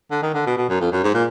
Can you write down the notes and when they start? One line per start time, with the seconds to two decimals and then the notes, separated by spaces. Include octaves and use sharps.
0.11 D3
0.23 D#3
0.34 D3
0.46 B2
0.57 B2
0.69 F#2
0.81 F2
0.92 F#2
1.03 G#2
1.14 A#2